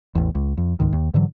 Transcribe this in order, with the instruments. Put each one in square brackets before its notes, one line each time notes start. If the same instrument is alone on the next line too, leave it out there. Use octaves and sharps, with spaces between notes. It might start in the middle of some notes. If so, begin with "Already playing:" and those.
[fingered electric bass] A1 E2
C#2
F2
C#2 G#2 D#3
D#2
G#2 D3 E3 F#3